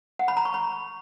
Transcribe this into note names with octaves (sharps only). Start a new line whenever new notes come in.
F#5
B5
A#5
C#6
B5